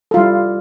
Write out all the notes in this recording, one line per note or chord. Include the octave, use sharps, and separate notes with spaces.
G3 E4 F4 A4